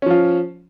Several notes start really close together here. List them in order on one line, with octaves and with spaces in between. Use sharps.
C#4 F3 F4